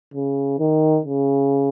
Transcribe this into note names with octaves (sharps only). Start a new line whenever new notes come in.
C#3
D#3
C#3